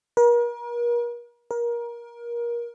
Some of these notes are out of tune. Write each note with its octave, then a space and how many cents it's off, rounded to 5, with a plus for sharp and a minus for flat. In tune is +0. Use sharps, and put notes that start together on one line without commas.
A#4 +40
A#4 +25